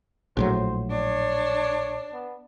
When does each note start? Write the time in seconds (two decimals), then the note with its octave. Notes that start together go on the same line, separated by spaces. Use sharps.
0.37 A#1 A2 F#3 C5
0.91 D4 C#5
2.13 B3